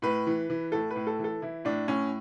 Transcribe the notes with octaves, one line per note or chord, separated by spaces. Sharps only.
A2 B4
E3
E3
A2 A4
B4
A2
A4
E3
A4
E3 E4
A2 D4
A2 C#4